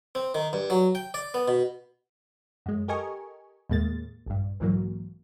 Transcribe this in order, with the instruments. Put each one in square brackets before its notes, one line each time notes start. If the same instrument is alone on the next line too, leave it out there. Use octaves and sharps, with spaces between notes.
[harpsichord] C4
D#3
G2
F#3
G5
D5
B3
B2
[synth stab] F#2 G#3
G4 A4 A#4 D#5 G#5 C#6
D#2 A2 G#3 A#3 A6
A#1 G2
B1 G#2 E3 F#3 A#3